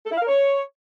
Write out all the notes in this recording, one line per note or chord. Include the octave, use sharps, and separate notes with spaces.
A4
E4
F5
A#4
C#5